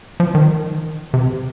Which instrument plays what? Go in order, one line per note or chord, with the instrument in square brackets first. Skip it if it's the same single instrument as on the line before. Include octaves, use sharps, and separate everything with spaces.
[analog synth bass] F3
D#3
C3